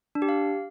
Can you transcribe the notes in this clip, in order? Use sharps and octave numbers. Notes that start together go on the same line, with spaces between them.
D4
G4
F5